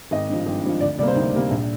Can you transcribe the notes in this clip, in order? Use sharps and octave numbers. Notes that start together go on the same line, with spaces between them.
G#1 D#5
G2 F3
G#1
G2 F3
D2 D5
C3 G3 A#3 D5
C5
D2 D#4
C3 G3 A#3
A#1